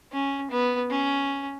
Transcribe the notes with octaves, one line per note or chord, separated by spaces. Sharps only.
C#4
B3
C#4